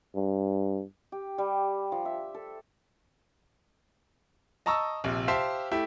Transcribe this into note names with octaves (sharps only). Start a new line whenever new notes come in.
G2
G4
G3
F3
E5
A4
D#5 A5 A#5 C#6 E6
A#1 C3
G4 C5 E5 F5 A5
A3 E4 G4